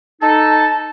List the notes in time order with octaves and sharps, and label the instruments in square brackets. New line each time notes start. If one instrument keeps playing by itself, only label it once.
[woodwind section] D#4 A4 [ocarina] A5